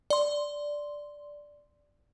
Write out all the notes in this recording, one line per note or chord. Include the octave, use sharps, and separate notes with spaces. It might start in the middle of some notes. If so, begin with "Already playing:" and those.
D5 C6